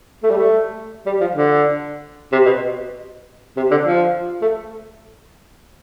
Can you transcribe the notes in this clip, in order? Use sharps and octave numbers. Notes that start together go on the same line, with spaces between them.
A3
G3
A3
G3
F3
D3
C3
B2
C3
D3
F3
A3